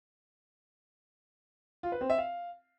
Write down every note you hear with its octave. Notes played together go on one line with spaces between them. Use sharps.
F4
B4
C4
E5
F5